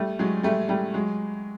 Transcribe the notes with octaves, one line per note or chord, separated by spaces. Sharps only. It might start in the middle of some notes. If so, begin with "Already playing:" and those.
Already playing: G3 A3
F#3 G#3
G3 A3
G3 A3
F#3 G#3